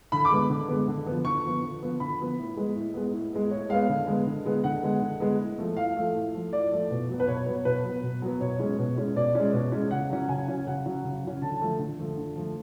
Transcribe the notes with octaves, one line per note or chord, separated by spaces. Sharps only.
D3 B5
D6
G#3 B3
D3
G#3 B3
D3
F3 B3
D3 C#6
F3 B3
D3
F3 B3
D3 B5
F3 B3
A2
G#3 B3
A2
G#3 B3
A2
G#3 B3
A2 C#5
G#3 B3 F5
D3
G#3 B3
D3
G#3 B3
D3 F#5
G#3 B3
D3
G#3 B3
A2
F3 A3
A2 F5
F3 A3
A2
F3 A3
A2 D5
F3 A3
B2
F#3 B3
B4
B2 C#5
F#3 B3 C#5
B2 B4
F#3 B3
B2
F#3 B3
B2 C#5
G#3 C#4
B2
G#3 C#4
B2 D5
G#3 C#4
B2
G#3 C#4
C#3 F#5
F#3 C#4
C#3 G#5
F#3 C#4
C#3 F#5
F#3 C#4
C#3
F#3 C#4
D3 A5
F3 A3
D3
F3 A3
D3
F3 A3